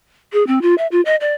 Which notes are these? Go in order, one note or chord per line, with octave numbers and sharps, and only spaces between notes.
G#4
C4
F4
E5
F4
D#5
D5